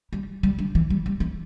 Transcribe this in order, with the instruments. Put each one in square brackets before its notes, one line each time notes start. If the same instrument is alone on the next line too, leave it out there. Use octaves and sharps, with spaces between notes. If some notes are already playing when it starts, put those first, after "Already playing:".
[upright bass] G3
G3
D3
E3
G3
G3
E3